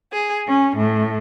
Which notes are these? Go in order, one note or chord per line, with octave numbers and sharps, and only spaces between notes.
G#4
C#4
A2